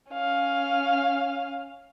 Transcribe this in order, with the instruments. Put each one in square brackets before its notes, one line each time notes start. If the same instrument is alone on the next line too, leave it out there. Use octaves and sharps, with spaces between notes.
[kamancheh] C#4 F5